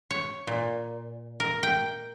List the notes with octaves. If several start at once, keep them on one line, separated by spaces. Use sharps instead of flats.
C#5
A#2
A#4
G5